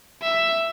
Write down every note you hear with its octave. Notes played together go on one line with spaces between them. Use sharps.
E5